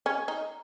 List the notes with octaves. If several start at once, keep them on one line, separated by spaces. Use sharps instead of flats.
C#4
D#4